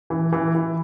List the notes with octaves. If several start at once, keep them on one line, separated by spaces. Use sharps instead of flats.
E3
E3
E3